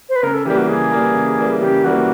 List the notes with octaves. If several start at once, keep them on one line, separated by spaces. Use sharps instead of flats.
C5
B4
C#3 A#4
A4
E3 G3 A#3 G4
F#4
C#3 G#4
E3 G3 A#3
C#3
E3 G3 A#3
C#3 G4
E3 G3 A#3 F#4